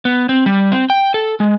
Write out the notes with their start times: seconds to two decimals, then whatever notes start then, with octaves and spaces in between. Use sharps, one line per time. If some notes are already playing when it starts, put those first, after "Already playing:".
0.05 B3
0.29 C4
0.46 G3
0.72 C4
0.90 G5
1.14 A4
1.40 G#3